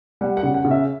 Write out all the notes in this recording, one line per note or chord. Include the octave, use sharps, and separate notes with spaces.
G3 F#5
F#5
C#3
F#5
C#3
E5